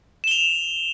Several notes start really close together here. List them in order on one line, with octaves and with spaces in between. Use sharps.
E7 G7 F7